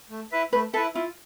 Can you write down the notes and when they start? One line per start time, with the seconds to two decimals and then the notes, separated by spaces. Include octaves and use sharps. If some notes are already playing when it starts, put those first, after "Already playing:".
0.10 A3
0.32 E4 B4 E5
0.53 A3 B4
0.74 E4 A4 B4 E5
0.94 E4 F4